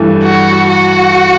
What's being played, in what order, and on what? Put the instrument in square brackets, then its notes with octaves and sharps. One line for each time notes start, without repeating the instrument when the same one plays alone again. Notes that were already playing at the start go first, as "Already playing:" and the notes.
Already playing: [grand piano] G2 E3 A3
[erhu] F#4
F#4